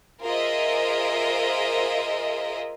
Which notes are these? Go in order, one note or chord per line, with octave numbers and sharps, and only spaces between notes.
F4 G#4 A#4 C5 D#5 E5